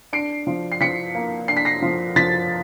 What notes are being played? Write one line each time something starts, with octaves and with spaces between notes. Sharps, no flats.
D4 C7 D7
F3
C7
F3 B6 C#7
A#3
D4 C7
B6
A#6 C7
F3
F3 A6 B6